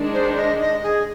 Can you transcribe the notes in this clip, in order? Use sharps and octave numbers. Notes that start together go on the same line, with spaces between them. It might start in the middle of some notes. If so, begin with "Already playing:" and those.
Already playing: D#3 G#3 D4
C5
D#5
D#5
G#4